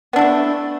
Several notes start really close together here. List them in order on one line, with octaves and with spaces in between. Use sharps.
B3 D4 E4 A3